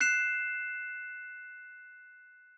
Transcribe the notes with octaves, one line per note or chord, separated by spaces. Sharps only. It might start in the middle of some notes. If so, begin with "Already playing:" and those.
F#6 C7 E7